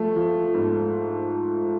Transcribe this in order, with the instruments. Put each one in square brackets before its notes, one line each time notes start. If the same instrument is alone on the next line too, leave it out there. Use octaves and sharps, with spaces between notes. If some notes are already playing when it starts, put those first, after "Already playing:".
Already playing: [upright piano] F3 A3
F3
G#2